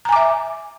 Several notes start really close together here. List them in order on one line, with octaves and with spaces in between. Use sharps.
A#5 G#5 D6 E5